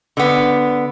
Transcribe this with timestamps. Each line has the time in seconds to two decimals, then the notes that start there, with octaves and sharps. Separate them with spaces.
0.17 D3 B3